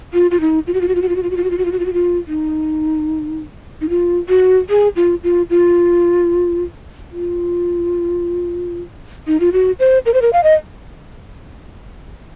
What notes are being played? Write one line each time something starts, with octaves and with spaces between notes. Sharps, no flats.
F4
F4
D#4
F4
F#4
F4
F#4
F4
F#4
F4
F#4
F4
F#4
F4
F#4
F4
F#4
F4
F#4
F4
F#4
F4
D#4
D#4
F4
F#4
G#4
F4
F4
F4
F4
D#4
F4
F#4
C5
A#4
C5
A#4
F5
D#5